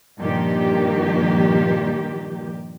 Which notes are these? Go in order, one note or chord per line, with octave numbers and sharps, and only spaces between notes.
G2 A#2 D#3 F3 G4